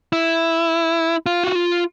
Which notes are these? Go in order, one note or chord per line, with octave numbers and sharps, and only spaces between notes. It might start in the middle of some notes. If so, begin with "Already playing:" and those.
E4
F4
F#4
F4